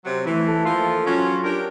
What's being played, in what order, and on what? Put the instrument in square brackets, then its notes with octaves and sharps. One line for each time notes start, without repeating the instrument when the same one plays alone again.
[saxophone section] C3 F#3
[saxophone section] E3 [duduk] A3
[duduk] A4
[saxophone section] F3 A#3 F4
[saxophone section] F#3 C#4 [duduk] F4
[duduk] D4 [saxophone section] G4 A#4